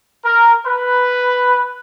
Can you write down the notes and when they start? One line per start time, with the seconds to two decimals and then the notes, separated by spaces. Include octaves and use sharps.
0.25 A#4
0.67 B4